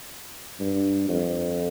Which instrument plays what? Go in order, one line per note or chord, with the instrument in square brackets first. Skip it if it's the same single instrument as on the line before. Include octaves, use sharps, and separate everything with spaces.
[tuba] G2
F2